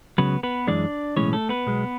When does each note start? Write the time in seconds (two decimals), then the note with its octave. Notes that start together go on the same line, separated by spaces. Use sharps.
0.18 C#2 C#3 F#3 B3 B4
0.43 B3 B4
0.67 F#2 E3 G#3 D4 D5
1.16 B1 A2 E3 G#3 C#4 C#5
1.33 A3 A4
1.49 B3 B4
1.67 B1 B2 G#3